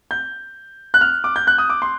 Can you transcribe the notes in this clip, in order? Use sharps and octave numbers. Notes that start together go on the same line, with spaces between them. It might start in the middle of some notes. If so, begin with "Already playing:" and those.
G6
F#6
F6
D6
G6
F#6
D#6
D6
C6